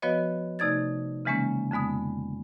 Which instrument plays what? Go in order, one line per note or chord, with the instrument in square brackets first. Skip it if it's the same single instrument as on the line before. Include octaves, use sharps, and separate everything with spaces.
[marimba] F3 B3 F#4 B4 C#5 D#5
C3 A3 D#4 D5 G#6 A6
C#3 E3 G#3 A#3 C#4
F2 D3 G#3 B3 D#6